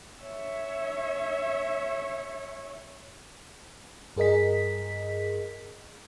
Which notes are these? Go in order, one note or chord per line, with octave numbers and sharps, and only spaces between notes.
C#5 E5
G2 G#4 A#4 D#5 B6